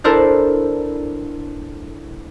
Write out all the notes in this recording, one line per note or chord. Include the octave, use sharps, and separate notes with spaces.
D4 E4 A4 A#4 C5 D5